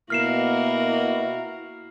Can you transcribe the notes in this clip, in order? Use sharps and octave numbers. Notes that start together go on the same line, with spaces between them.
B2 A#3 E4 F#4 A#4 F6 C7 E7